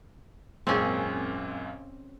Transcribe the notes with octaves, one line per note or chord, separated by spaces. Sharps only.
G#1 F#2 A#2 C4 C#4 G#4